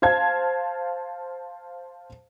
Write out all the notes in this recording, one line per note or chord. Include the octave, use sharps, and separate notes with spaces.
C5 F5 A5 G#6